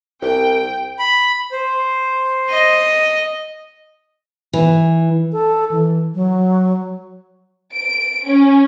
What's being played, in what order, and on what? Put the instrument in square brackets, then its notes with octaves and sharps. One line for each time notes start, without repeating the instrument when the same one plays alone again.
[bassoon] C2 [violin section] G5
[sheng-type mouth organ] B5
C5
[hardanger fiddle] D#5
[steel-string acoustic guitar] E3
[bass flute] A4
E3
F#3
[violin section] D7
C#4